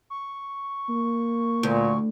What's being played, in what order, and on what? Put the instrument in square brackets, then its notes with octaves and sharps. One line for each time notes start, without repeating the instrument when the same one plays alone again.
[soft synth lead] C#6
[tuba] A#3
[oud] D2 [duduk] A#2